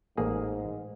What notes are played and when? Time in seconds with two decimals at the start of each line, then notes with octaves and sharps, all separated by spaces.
0.17 A1 G#2 A#3 G#4